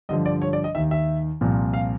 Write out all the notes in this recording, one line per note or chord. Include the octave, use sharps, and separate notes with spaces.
G2 D3 F3 D#5
D5
C#5
D5
D#5
D#2 D#3 E5
E5
C2 A#2 F3
F5